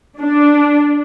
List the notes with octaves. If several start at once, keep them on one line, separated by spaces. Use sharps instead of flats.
D4